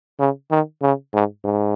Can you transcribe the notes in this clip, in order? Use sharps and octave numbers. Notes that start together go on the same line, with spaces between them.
C#3
D#3
C#3
G#2
G#2